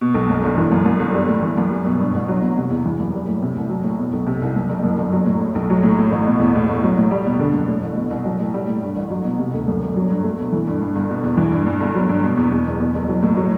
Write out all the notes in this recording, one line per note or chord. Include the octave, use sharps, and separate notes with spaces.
B2
B1
F#2
G1
E3
F#2
F#2
G1
G3
A2
E3
F#2
G3
B2
G2
A1
F#3
B2
C3
E2
E3
F#2
G3
A2
C3
C2
F#3
A2
B2
B1
C3
C2
F#2
F#1
F#2
G1
F#3
A2
A2
B1
F#3
A2
A2
A1
B2
E2
A2
A1
F#3
A2
G3
B2
D3
F#2
A2
A1
B2
C2
F#3
A2
G3
A2
G2
A1
F#3
B2
C3
D2
F#2
G1
F#3
G2
A3
B2
E3
G2
G2
G1
B2
E2
E3
G2
G2
G1
F#3
G2
B2
E2
E2
F#1
E2
F#1
F#3
A2
F#3